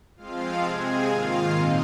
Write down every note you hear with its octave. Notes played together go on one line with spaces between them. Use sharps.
F2 F3 G#3 C4 F4 F5
C3 G#3 C4 G#4 G#5
G#2 D#3 A#3 F4 F5
A#2 G#3 C4 D#4 D#5